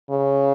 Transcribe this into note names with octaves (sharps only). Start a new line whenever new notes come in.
C#3